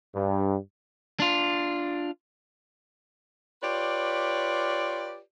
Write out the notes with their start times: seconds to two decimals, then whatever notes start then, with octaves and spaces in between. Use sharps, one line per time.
0.14 G2
1.20 D4 F4
3.62 F4 G4 B4 C#5 D5